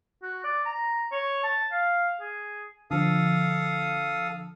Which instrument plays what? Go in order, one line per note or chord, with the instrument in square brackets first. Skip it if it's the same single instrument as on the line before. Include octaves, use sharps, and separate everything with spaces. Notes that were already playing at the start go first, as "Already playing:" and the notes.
[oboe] F#4
D5
A#5
C#5
A5
F5
G#4
[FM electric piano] D3 F3 [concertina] A4 F5 D#6